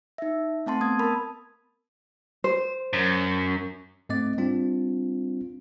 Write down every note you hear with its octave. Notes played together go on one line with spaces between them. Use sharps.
D#4 E5
A3 C4 A5 C6
B3 D#6 G#6
A#4 A5 B5
C5
F#2
G#2 A3 C4 D#5 D6 A6
G3 C4 D4 F4